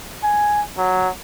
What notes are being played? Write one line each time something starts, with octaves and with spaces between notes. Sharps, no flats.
G#5
F#3